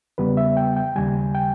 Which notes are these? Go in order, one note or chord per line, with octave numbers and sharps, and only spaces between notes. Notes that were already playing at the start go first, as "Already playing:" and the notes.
E2 C#3 G3 B3 B4
E5
G5
G5
D#2 C#3 G3 G#5
G5